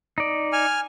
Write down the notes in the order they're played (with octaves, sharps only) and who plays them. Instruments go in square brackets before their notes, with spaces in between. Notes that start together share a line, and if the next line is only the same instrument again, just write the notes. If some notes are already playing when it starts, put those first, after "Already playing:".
[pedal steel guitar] D#4 D5
[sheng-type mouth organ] G#5 F6